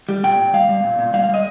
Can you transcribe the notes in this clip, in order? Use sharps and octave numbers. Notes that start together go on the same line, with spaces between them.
G3
A#2 G5
A#2
G3 F5
G3
A#2
A#2
G3 F5
F5
G3 D#5